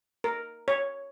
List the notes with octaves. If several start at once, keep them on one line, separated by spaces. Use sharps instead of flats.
A#4
C#5